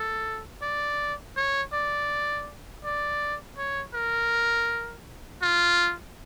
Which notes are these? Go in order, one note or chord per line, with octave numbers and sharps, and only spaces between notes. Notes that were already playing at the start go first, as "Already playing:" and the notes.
Already playing: A4
D5
C#5
D5
D5
C#5
A#4
F4